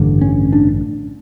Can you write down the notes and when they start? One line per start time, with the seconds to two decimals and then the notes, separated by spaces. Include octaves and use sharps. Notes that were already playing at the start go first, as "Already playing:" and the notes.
Already playing: A1 G2 D3
0.21 C#4
0.53 D4